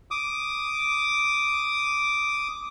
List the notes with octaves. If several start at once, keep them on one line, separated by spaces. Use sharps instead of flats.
D6 D#6